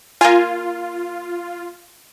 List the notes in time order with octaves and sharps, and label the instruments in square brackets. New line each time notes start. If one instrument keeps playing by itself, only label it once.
[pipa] A#3 G#5 [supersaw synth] F4